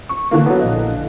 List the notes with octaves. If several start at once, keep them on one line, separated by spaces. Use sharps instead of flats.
C#6
D3 E3 A#3
F#3 B3
A#1 D#5